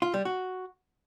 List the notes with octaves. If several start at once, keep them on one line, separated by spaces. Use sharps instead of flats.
F4
G3
F#4